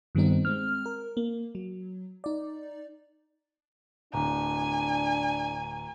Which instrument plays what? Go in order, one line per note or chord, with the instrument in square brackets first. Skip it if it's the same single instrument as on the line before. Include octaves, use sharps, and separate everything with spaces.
[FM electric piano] G2 D#3 G3 B3 C4 D#4
G#3 C4 F6
A#4
A#3
F#3
D#4 D5
[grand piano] D1 [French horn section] D4 [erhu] G#5 [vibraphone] A#5